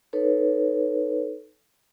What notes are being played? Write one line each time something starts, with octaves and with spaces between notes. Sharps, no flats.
D#4 A4 B4 C#5